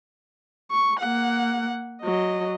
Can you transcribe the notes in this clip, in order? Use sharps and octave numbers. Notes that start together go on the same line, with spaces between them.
C#6
A#3 F#5
F#3 D#5